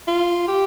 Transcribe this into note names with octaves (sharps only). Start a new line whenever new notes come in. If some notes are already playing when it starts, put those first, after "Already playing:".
F4
G4